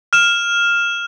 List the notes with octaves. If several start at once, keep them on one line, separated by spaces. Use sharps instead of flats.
F6 E7